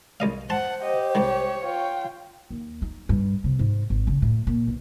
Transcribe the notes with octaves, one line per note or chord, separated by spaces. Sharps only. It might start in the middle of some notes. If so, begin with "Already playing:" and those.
C2 D#5 F5
C5 F#5 A5 C6
G4 D#5
C2 D#3 C#5
F4 G5
D#2
D#4
G2
C3
G#2
G#1
C#3
A2
A#2
B1